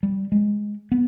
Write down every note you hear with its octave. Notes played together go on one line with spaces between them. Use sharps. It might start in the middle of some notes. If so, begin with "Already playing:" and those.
G3
G#3
B3